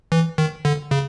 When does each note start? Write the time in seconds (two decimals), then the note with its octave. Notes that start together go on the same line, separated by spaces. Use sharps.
0.12 E3
0.38 D#3
0.65 D3
0.91 C#3